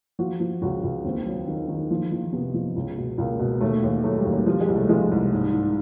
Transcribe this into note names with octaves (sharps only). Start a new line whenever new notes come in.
F3 F#4
F3
C#2 F#4
C#2
D#2 C4
F#3
D#3
D#3
F3
F3
C3 B3
F3
C#2
B2
C#2 A#3
B2
D#2 A3
D#2
F#3 A3
G3
D#2
G3
F3 G3
G#3
C2
A3
F3 G#3
C2
G#2
G#2